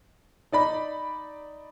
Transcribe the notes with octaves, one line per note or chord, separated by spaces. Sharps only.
D#4 D5 B5